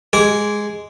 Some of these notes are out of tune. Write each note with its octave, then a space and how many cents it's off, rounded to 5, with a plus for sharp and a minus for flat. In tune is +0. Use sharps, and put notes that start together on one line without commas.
G#3 +0 G#4 +0 D6 -20